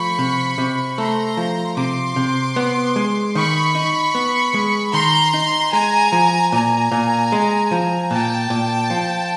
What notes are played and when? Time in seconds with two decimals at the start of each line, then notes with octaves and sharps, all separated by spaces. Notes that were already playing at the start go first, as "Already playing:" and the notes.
Already playing: F3 A3 B5 C#6
0.19 C3
0.58 C3
0.97 A3 A#5 C6
1.37 F3
1.77 C3 C6 D6
2.16 C3
2.56 B3
2.96 G#3
3.35 D#3 B5 C#6
3.75 D#4
4.15 B3
4.54 G#3
4.93 D#3 A#5 C6
5.34 D#4
5.73 G#3 G#5 A#5
6.12 F3
6.52 A#2 G#5 A#5
6.92 A#2
7.32 G#3
7.72 F3
8.11 A#2 G5 A5
8.50 A#2
8.90 F3